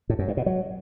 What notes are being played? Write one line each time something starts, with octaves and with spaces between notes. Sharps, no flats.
A2
F#2
G2
B2
F#3